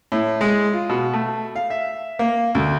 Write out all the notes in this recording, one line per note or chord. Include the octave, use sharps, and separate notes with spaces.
A2
G#3
F4
B2
A3
F5
E5
A#3
D2